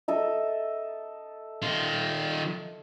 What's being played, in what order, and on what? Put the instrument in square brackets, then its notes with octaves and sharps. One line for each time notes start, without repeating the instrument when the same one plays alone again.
[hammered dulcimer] A4 D#5 E5
[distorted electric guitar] D#3 F4